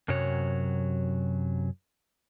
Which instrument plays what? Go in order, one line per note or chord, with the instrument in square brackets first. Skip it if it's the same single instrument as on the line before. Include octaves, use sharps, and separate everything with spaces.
[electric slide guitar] F#2 C3 F#3 C#5